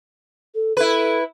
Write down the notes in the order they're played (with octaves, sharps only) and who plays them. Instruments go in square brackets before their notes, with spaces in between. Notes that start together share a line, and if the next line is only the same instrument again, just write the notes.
[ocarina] A4
[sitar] E4 B4 [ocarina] A4